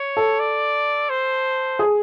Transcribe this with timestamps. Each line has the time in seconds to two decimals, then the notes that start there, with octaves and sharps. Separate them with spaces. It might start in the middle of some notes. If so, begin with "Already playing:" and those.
Already playing: C#5
0.17 A4
0.40 D5
1.10 C5
1.79 G#4